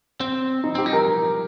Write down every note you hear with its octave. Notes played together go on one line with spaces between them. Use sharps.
C4
D#4
C4 G4
D#4
A#4